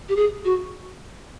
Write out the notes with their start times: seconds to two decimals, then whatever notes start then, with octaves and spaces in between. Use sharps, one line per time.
0.09 G4
0.16 G#4
0.45 F#4